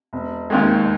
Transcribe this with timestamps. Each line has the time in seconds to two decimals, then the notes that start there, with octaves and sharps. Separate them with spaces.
0.13 E1
0.50 D#2 D#3 G#3